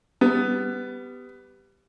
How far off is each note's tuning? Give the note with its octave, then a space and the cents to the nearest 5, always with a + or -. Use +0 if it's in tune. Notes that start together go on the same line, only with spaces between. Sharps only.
G3 +0 B3 +15